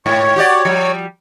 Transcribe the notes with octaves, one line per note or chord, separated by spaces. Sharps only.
G#2 C#5
F#4 G4 D5
F3 G3